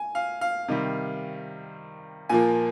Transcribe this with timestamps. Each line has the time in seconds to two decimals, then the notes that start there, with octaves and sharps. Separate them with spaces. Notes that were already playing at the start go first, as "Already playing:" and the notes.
Already playing: G#5
0.15 F5
0.41 F5
0.68 C3 D#3 G3
2.29 A#2 F3 A#3 G#5